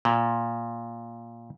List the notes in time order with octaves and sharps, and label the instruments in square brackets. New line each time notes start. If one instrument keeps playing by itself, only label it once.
[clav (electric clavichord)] A#2